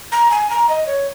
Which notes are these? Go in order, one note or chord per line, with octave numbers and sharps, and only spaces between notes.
A#5
G#5
A#5
D#5
C#5